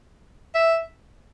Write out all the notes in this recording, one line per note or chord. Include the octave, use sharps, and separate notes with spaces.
E5